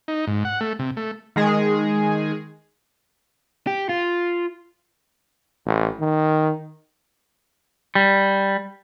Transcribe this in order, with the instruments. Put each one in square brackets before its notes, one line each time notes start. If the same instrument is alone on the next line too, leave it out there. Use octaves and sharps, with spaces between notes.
[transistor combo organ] D#4
G#2
F#5
A3
C3
A3
[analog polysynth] D#3 G#3 G#4
[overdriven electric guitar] G4
F4
[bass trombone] A1
D#3
[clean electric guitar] G3